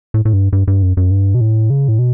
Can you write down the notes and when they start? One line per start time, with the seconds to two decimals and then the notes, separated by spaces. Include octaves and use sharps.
0.14 A2
0.25 A2
0.33 G2
0.53 G2
0.68 G2
0.83 F#2
0.97 F#2
1.11 G2
1.35 B2
1.41 A2
1.70 C#3
1.88 A2
1.99 B2